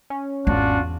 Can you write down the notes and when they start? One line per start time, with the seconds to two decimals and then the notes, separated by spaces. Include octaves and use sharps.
0.10 C#4
0.47 G#1 E2 D4 F4 F#4